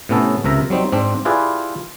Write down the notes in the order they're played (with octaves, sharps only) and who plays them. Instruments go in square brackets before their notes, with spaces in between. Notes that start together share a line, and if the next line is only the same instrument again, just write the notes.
[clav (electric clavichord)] A2 C3 B3 C#4 A4
C#2 C3 A#4 E5 A#5
F#3 G3 C4 D#4
G#2 C4 D4
E4 F4 G4 G#4 B4 D5